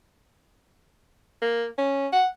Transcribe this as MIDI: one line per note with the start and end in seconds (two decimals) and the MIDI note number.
1.42 1.66 58
1.78 2.08 61
2.13 2.27 78